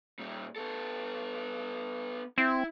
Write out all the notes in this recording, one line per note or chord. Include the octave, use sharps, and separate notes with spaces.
A#2 G3
B3 A4
C4 E4